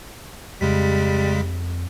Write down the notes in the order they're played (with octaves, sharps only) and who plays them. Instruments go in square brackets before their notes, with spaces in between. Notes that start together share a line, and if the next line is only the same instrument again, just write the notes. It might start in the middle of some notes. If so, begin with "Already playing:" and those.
[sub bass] F2 [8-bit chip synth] C#3 G#3 B6 [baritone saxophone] G3